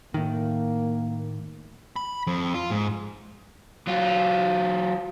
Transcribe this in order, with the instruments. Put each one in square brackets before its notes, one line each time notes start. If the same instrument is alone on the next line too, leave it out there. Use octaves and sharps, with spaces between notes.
[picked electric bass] A2 D#3 [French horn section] A#3
[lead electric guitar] B5
F2
F4
G#2
[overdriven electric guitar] F#3 F4